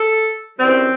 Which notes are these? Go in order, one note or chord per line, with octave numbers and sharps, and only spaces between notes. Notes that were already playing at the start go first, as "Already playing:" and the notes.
Already playing: A4
F#2 E3 G3 C4